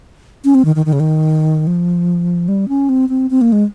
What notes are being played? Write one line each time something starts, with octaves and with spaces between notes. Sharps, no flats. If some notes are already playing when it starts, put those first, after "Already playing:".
C#4
C4
D#3
D#3
D#3
C#3
D#3
F3
G3
C#4
C4
C4
C4
A#3
G#3